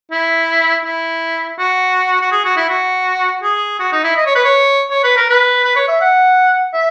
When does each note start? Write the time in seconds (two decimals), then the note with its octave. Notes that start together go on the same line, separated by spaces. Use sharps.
0.12 E4
0.85 E4
1.59 F#4
2.21 F#4
2.32 G#4
2.45 F#4
2.57 E4
2.69 F#4
3.43 G#4
3.80 F#4
3.92 D#4
4.04 E4
4.17 D#5
4.26 C#5
4.36 B4
4.45 C#5
4.90 C#5
5.04 B4
5.17 A#4
5.30 B4
5.64 B4
5.76 C#5
5.88 E5
6.01 F#5
6.74 E5